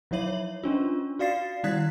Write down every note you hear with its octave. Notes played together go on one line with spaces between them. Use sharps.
F3 F#3 E4 C#5 E5 F#7
C#5
C#4 D4 F4
F#4 D5 F5 A6 C7
D#3 G3 E4 F#6 G#6 B6